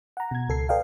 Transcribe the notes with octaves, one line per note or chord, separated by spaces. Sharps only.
F#5 A#5
B2 G#6
C#2 A4 C7
A4 B4 D5 D#5 F5 G5